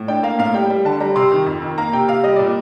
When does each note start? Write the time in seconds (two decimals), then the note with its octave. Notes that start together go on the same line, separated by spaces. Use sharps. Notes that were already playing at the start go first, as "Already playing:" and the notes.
Already playing: A2
0.08 D4 G5
0.23 A#3 F5
0.39 A2 F5
0.54 G3 G5
0.70 G3
0.85 D3 A5
1.00 G3 A#5
1.16 C3 C6
1.32 D#3
1.46 F2
1.62 D#3
1.78 A#3 A#5
1.93 C3 G5
2.08 C3 F5
2.23 G3 D#5
2.36 A#2 D5